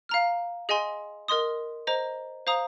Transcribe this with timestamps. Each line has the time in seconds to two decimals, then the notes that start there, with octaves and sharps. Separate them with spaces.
0.09 F5 A#5 F6
0.69 G#4 D#5 G#5 C6
1.28 A#4 D#5 C6 D#6
1.87 C5 D#5 A#5
2.47 C5 F5 A#5 D#6